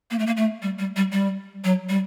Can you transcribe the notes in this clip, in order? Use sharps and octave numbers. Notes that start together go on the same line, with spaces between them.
A#3
A3
A#3
A3
G3
G3
G3
G3
F#3
G3